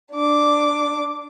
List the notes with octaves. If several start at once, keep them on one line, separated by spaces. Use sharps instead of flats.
D4 D6